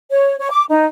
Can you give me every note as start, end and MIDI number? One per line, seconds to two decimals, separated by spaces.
0.11 0.36 73
0.40 0.51 73
0.51 0.63 86
0.70 0.86 63